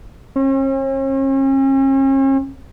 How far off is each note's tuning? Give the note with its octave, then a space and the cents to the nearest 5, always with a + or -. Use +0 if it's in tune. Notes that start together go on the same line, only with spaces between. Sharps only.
C#4 -45